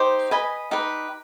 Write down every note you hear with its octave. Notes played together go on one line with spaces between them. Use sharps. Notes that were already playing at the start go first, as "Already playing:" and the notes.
Already playing: D#4 G4 C5
B4 D#5 G#5 B5
D#4 G4 B4